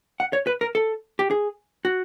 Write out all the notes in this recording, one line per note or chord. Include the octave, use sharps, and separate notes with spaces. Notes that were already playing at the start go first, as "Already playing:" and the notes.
F#5
C#5
B4
A#4
A4
G4
G#4
F#4